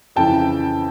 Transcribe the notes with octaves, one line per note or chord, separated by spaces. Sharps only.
F2 C#3 E3 G5 A5